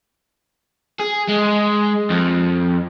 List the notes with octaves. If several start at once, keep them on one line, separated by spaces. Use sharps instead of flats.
G#4
G#3
F2